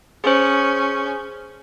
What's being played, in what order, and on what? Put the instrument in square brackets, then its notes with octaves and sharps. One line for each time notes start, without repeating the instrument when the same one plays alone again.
[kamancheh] C#4 [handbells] G#4 C5